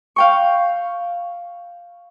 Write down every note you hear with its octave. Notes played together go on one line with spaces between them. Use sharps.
F5 G5 C#6